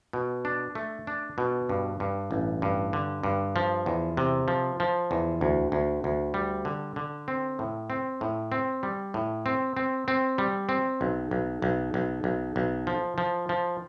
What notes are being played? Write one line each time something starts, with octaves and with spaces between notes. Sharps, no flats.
B2
D4
A3
D4
B2
G2
G2
A1
G2
D3
G2
F3
E2
C3
F3
F3
E2
D2
D2
D2
G3
D3
D3
C4
A2
C4
A2
C4
G3
A2
C4
C4
C4
G3
C4
B1
B1
B1
B1
B1
B1
F3
F3
F3